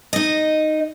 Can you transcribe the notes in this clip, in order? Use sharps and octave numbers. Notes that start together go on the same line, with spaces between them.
D#4 D#5